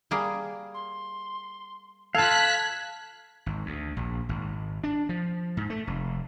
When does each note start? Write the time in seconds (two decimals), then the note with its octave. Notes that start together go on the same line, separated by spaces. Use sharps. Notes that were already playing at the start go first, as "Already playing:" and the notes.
0.11 G3 A#3 G#4
0.74 C6
2.15 F4 A4 F5 A5 F#6 G#6 B6
3.46 G#1
3.66 D2
3.97 A#1
4.29 G#1
4.84 D4
5.09 F3
5.57 G#2
5.70 A3
5.87 F1